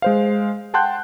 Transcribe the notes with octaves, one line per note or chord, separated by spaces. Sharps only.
G#3 C5 F5
F#5 G5 A5 C6 F#6 G6